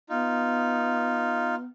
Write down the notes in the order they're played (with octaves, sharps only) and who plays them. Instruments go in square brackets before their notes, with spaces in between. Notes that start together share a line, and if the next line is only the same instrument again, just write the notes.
[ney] B3 [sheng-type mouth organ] D#4 F4